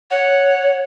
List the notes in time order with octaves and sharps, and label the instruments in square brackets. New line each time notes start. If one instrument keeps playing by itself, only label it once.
[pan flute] C#5 [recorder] F#5